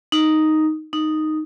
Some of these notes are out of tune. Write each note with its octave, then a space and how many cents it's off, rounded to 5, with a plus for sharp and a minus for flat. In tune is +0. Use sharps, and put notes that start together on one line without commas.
D#4 +0
D#4 -5